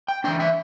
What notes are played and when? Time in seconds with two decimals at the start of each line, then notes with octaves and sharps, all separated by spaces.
0.08 G5
0.24 E3 A3 D4 G5
0.40 E5